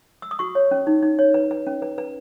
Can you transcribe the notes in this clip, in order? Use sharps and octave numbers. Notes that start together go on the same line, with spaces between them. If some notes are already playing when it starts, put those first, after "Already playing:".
E6
D#6
F#4 C#6
C#5
C#4
D#4
D#4
C#5
B4
B4
C#4
B4
B4